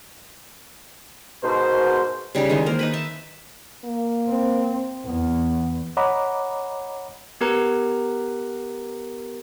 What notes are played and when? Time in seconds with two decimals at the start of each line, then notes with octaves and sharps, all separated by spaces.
1.43 G#2 B2 A#4 C5
2.35 C#3 G3 D#4 G4
2.50 D#3 E3 G#3
2.66 A#3 A#4 C5
2.79 D#4 B4 B5
2.93 E5 A5
3.85 A#3
4.28 C4
5.06 E2 B3
5.97 C#5 D#5 F#5 A#5 B5 D6
7.41 B3 G4 A#4 B4 A#5